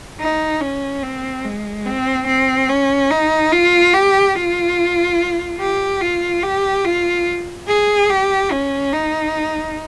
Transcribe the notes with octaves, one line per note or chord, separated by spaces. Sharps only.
D#4
C#4
C4
G#3
C4
C4
C#4
D#4
F4
G4
F4
G4
F4
G4
F4
G#4
G4
C#4
D#4